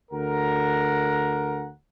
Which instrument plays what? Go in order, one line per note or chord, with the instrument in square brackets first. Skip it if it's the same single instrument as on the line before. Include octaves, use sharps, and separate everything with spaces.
[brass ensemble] D2 A#4 F#5 A#5